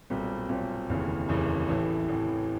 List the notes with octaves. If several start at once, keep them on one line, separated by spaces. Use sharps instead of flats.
B1 A#2 G3 C4
B1 A#2 G3 C4
F1 D#2 C#3 E3
F1 D#2 C#3 E3
A1 A2 E3
A1 A2 E3